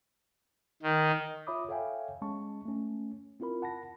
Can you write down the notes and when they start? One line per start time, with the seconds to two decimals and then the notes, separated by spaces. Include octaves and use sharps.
0.82 D#3
1.47 F4 C#5 E5 B5 D6 D#6
1.69 A4 C#5 E5 F5 G5 G#5
2.22 G#3 C#4 A5 C#6
2.65 A3 C#4
3.40 C4 E4 F4 A#4 B5
3.62 F#5 A5 B5 A#6